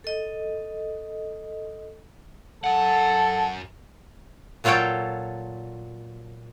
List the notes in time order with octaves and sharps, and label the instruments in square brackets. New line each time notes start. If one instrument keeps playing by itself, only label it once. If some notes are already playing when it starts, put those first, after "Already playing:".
[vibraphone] A4 D#5
[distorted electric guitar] F#2 F#5 [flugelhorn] A4
[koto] A#2 F#3 F4 A4 C#5 G5